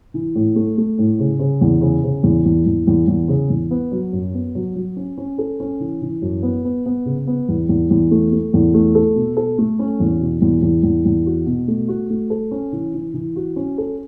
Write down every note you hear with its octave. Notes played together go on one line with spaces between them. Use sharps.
E3
A2
A3
A3
A2
C#3
C#3
E2
C#3
C#3
E2
E2
E2
E2
E2
C#3
E2
B3
F#3
F#2
B3
F#3
F#3
C#4
C#4
A4
C#4
E3
E3
F#2
B3
B3
B3
C#3
B3
E2
E2
E2
A3
A3
E2
A3
A4
B2
A4
A3
C#4
E2
B2
E2
E2
E2
E2
F#4
B2
A3
F#4
A3
A4
C#4
E3
E3
E3
F#4
C#4
A4